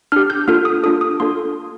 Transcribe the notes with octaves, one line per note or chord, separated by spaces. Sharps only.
D4 G4 F6
G6
A#3 D4 F4 A4 F6
D#6
A#3 D4 F4 A4 D#6
D#6
A#3 D4 F4 A4 C6